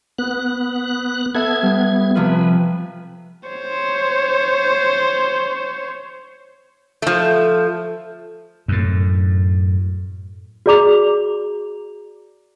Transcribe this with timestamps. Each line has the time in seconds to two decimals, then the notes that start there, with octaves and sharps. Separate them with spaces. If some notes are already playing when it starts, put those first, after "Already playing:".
0.19 B3 F#6
1.35 B3 A4 E5 G#6
1.62 G3
2.15 C3 F3 F4 B4
3.49 C5 C#5
7.02 F3 A3
8.68 F#2 A2
10.66 F#4 G#4 D5 A#5 D6 F7